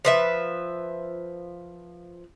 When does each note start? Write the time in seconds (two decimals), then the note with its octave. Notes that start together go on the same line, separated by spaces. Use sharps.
0.05 F3 B4 E5